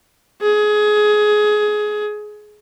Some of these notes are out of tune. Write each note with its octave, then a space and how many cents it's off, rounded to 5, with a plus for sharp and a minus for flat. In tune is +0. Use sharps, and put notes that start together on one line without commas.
G#4 +20